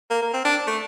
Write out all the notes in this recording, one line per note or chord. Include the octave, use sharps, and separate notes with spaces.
A#3
A#3
C4
D4
A3